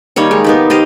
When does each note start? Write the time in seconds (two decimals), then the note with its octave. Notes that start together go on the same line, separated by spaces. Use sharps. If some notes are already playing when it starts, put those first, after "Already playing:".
0.16 D#3 G3 A#3 C#5
0.31 G#3
0.44 B3 D#4 G4
0.70 G4 C5 D#5 F5